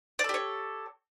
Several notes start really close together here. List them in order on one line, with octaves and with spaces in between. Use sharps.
D5 A4 G4 C#5